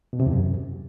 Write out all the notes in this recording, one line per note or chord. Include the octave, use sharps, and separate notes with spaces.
B2
C3
E2
F#2